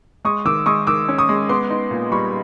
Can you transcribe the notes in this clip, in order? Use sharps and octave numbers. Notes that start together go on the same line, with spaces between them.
G#3 C#6 D#6
D#3 D6 E6
G#3 C#6 D#6
D#3 D6 E6
C#4
C#6 D#6
G#3
B3 C6 D6
D#4
A#2
G3 B5 C#6